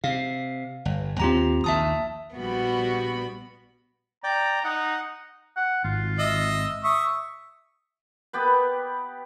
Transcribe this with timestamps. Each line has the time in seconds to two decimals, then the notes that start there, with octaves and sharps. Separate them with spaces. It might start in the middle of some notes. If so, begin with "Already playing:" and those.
0.04 C3 F5
0.85 G1
1.20 D#2 C4 F4 G4 A#5
1.64 A#1 D#2 A#2 E5 A5 D#6
2.35 A#1 G3 B3 F#4 B5
4.24 D5 G5 A#5
4.64 D#4 F#5
5.57 F#5
5.84 G#1 F4
6.19 D#5 E5
6.84 E5 C#6 D#6
8.33 B3 G4 B4